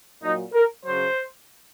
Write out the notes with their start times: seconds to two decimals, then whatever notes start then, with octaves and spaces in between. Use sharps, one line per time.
0.22 A#2 F#3 D#4
0.53 A#4
0.84 C#3 F#3 C5